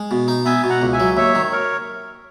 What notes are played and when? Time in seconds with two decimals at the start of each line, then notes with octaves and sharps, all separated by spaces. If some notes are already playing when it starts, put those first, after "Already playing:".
Already playing: G#3
0.11 B2
0.28 D#4
0.45 B3 E5 G#5
0.64 B2
0.70 F#5 A#5
0.82 C#2
0.93 E5 G#5
1.00 F#3
1.17 D#2 C#5 E5
1.35 D#3
1.52 A#4 C#5